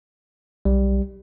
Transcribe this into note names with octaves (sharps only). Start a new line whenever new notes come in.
B1 G3